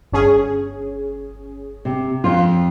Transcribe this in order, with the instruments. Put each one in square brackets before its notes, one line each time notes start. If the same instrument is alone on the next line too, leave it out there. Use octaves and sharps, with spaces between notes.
[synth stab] G1 C#4 G#4
[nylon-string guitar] C3
F2 F4